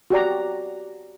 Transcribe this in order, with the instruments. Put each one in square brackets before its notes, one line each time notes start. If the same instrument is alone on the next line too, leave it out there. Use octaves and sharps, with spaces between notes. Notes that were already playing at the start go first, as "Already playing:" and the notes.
[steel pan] F#4 G4 D5 A#5